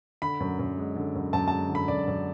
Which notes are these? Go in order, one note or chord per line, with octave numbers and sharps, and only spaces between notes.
D3 B5
F#2
F#2
G#3
D3
F#2
F#2 A5
A5
G#3
D3
B5
F#2 D5
F#2